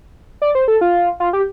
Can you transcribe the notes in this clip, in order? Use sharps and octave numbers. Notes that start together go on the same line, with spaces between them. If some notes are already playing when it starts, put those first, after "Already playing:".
D5
C5
A4
F4
F4
G4